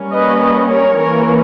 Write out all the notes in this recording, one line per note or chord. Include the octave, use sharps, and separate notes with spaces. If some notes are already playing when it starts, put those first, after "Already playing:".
Already playing: G3 A#3 C#4
B4 D#5
B4 D#5
A#4 C#5
E3 A#3 C#4 A#4 C#5